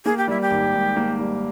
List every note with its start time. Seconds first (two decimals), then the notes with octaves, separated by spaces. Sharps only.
0.05 A#3 G#4
0.17 G4
0.28 G3 E4
0.41 G4
0.51 G#1
0.74 G#2
0.96 A#3
1.19 G3